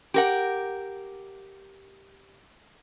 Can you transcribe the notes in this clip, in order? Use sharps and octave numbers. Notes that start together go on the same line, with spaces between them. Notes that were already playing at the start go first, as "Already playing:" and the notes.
G4 A#4 F#5